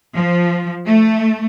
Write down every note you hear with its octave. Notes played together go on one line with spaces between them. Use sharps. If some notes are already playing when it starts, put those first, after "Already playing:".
F3
A3